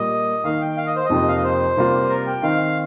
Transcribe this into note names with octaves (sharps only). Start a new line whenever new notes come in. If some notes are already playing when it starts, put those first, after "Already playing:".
Already playing: A#2 G3 A#3 D#5
D#3 A#3 D#4 F5
G5
F5
D#5
C5
D#5
F2 C3 F3 A#3 D#4
F5
D#5
C5
C3 G3 A#3 F4
A#4
G5
D#3 C4 D#4 F5